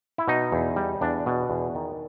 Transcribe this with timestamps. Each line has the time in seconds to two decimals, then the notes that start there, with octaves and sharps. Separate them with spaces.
0.18 E4
0.28 B2 D#4
0.52 E2
0.76 G3
1.01 E2 D4
1.26 B2
1.50 E2
1.75 D#3